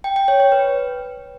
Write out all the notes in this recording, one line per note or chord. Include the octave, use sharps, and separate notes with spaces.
G5
G5
C#5
C#5
B4